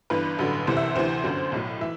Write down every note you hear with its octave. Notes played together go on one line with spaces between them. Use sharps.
G1 G2 E3 B4
A1 G2 D3 F#3
C2 C3 E3 C5
E5
D2 C3 E3 C5
G1 F#2 D3 F#3
B1 A2 F#3
E3 E5